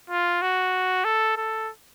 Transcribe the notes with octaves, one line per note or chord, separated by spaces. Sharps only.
F4
F#4
A4
A4